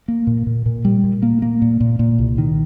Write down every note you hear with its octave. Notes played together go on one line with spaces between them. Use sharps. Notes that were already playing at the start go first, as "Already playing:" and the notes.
A#3
A#2
A#2
A#2
G3
A#2
A#3
A#3
A#2
A#2
A#2
C2
D#3